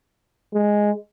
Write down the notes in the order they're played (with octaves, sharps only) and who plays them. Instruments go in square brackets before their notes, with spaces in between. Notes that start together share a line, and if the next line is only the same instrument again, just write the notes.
[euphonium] G#3